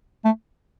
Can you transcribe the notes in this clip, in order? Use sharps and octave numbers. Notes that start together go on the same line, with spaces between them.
A3